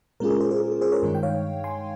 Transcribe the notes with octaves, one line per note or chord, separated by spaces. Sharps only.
A#2 G#3 C#4 F4 G#4 A#4
A#4
G#4 C5
G#4 C5
G#4
G#4
G#4 C5
A#4 C#5
G2 D#3 G#3 D#4
G5
C#5 F5
G#5 C6